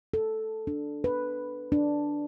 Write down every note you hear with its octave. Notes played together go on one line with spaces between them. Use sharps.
A4
D4
B4
D4